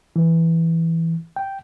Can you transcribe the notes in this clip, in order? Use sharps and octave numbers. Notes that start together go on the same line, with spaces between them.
E3
G5